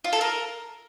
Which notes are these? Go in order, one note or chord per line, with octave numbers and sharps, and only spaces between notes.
F4
A4
A#4